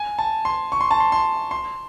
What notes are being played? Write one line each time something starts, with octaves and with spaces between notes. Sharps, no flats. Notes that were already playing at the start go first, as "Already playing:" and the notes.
Already playing: G#5
A5
C6
C#6
C6
A5
C6
C6
C6